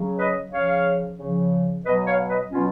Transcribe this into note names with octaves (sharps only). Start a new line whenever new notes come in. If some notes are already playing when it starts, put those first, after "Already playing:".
Already playing: C#3 F#3
B4 D#5
C#3 F3 C#5 F5
C#3 F3
B2 F#3 B4 D#5
C#5 F5
B4 D#5
B2 F#3 C#4 F4